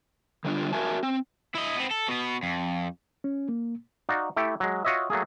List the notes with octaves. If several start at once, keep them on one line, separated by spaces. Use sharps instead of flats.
D3 G3 D4 F4
F#4 A#4 E5 G#5 A5
C4
E4 D#5
B3 C4
A4
B2 B3
F2
C#4
A#3
D#4 F#4 D5 F5
A3 E4 G4
F#3 G#3
F4 F#4 C#5 D#5 E5
F#3 A3 A#3 G#4